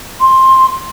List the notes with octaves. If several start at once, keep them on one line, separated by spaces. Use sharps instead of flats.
C6